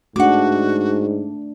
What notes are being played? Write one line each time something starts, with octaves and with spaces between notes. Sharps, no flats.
G#2 A3 D4 F#4 F#5 D6